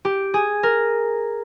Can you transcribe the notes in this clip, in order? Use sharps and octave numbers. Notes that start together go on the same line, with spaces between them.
G4
G#4
A#4